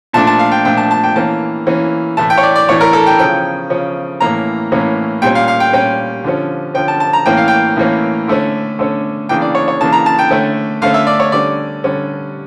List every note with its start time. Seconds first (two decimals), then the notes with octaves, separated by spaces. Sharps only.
0.13 A#2 F3 A3 D4 A5
0.27 A5
0.39 F5
0.52 G5
0.64 A#2 F3 A3 D4 G5
0.77 A5
0.91 A5
1.04 G5
1.16 E3 A#3 C#4 A5
1.67 E3 A#3 C#4
2.17 A2 E3 A3 A5
2.30 G5
2.38 C#5
2.43 D5
2.56 D5
2.68 A2 E3 A3 C#5
2.81 A#4
2.93 A4
3.06 G5
3.19 C#3 F3 C#4 G5
3.70 C#3 F3 C#4
4.20 A2 E3 A#3 C#4 A#5
4.72 A2 E3 A#3 C#4
5.22 A#2 G3 C#4 G5
5.35 F5
5.48 F5
5.60 G5
5.73 A#2 G3 C#4 G5
6.24 D3 F3 C#4
6.74 D3 F3 C#4 G5
6.88 A5
7.00 A5
7.13 A#5
7.26 A2 E3 A#3 C#4 G5
7.37 F5
7.48 G5
7.76 A2 E3 A#3 C#4
8.27 D3 A3 C#4
8.79 D3 A3 C#4
9.29 C#3 E3 A#3 D4 G5
9.42 D5
9.55 C#5
9.68 C#5
9.81 C#3 E3 A#3 D4 A5
9.93 A#5
10.06 A5
10.19 G5
10.31 D3 A3 C#4
10.81 D3 A3 C#4 F5
10.94 E5
11.07 D5
11.20 C#5
11.32 D3 G3 C#4 D5
11.84 D3 G3 C#4